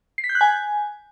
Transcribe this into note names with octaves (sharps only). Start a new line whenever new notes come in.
C7
B6
G6
F#6
G#5